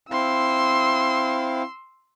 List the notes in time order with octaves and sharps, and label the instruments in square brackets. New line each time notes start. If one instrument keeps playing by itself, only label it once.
[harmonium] C4 E4 F5 [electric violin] C6 E6